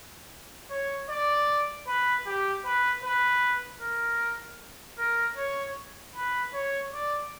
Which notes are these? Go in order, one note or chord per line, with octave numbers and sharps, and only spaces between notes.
C#5
D5
B4
G4
B4
B4
A#4
A#4
C#5
B4
C#5
D5